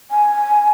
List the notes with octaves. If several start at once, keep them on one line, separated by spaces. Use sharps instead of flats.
G#5